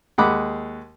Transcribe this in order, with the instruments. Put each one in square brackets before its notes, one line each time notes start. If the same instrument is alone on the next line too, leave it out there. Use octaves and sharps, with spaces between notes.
[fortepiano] D#2 G#3 F#5 B5 D6